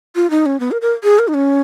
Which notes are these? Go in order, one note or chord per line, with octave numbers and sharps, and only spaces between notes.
F4
D#4
C#4
B3
A#4
A#4
G#4
A#4
D#4
C#4